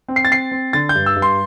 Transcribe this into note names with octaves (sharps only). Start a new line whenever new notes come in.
C4
C7
A6
C4 C7
C4
D3 A6
G6
G2
E6
G2
C6